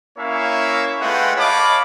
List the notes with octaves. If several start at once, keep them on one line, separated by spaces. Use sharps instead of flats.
A#3 C#4 E4 C#5 E5 F5
G#3 A3 F4 B4 F#5 G5
C#5 D#5 F5 A5 B5 D6